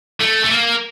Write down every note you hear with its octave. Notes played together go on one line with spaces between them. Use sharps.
A3
A3
A#3